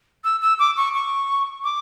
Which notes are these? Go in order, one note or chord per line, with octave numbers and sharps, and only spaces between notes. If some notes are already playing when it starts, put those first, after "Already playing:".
E6
E6
D6
C#6
C#6
D6